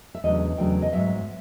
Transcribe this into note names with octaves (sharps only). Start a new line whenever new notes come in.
E5
E2 C#3 F#3 A3 D4 D#5
E2 C#3 F#3 A3 D4 G5
D#5
G#2 D#3 F#3 E5